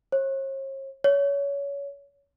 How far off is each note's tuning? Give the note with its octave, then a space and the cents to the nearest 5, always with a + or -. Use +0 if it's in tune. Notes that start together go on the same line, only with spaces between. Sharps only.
C#5 -45
C#5 +25